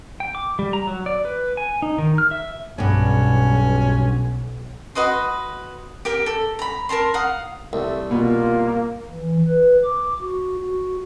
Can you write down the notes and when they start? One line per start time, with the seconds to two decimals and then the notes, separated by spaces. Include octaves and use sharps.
0.20 G5
0.35 D6
0.59 G3
0.73 A#5
0.87 F#3
1.06 D5
1.25 B4
1.57 G#5
1.82 D#4
1.98 D#3
2.18 F6
2.31 E5
2.78 B1 G2 B3 C#4
4.95 F#4 B4 D#5 C6
6.05 G4 A#4 G5
6.26 A4
6.59 A#5 B5
6.89 A#4 A5 A#5 C6
7.14 F5 F#5 D#6
7.73 C2 A3
8.11 B2 A#3 F4
9.11 E3
9.48 B4
9.84 D6
10.21 F#4
10.63 F#4